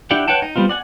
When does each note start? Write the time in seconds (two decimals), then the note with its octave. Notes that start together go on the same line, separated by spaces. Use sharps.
0.11 D4 E4 G4 F#5 G5
0.28 B4 C#5 F#5 G5 A5
0.42 D#4
0.56 G3 B3 C4 F4
0.69 D5 F#5 G#5